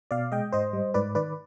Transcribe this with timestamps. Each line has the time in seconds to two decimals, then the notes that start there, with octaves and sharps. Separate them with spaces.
0.11 B2 D5 F5
0.32 G#3 D#5 G5
0.53 G#2 C5 D#5
0.73 G3
0.94 G#2 B4 D5
1.15 D#3 B4 D5